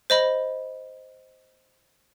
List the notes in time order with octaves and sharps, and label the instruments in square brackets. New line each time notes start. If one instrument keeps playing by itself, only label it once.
[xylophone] C5 D#5 B5